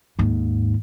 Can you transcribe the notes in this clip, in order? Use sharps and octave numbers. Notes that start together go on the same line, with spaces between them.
D#2 G#2